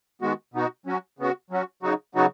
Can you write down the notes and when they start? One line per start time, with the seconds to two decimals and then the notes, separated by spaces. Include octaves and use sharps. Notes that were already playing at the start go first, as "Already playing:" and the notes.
0.22 D#3 G#3 B3 F#4
0.54 B2 B3 D#4 F#4
0.86 F#3 C#4 F#4
1.19 C#3 B3 F#4
1.50 F#3 C#4 F#4
1.83 C#3 F#3 D#4 F#4
2.15 C#3 F#3 B3 D#4 F#4